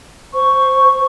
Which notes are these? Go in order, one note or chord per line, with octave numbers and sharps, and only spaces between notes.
C5 C#6